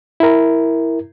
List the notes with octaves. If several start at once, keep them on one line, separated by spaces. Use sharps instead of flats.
E4 A#4